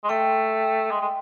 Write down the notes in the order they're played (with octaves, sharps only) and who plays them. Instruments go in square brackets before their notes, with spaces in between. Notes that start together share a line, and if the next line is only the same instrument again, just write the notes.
[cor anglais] G#3
[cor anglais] A3 [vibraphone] G5
[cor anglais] G#3
G#3